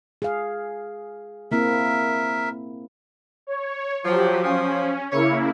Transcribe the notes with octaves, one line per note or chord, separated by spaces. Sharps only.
G#4 F5
A#3 C4 E4 A#4 E5
C#5
F3 F#3 G4
F3 C#4
C#3 A#3 E4 C#5